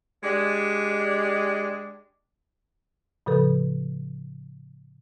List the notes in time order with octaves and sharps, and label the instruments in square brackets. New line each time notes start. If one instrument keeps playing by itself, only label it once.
[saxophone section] G#3 D4 G4 D5 D#5
[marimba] A2 C#3 F3 A4 B4